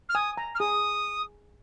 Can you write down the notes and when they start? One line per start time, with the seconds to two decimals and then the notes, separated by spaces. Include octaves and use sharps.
0.09 F6
0.14 G#5 D#6
0.37 A#5
0.55 F6
0.59 G#4 D#6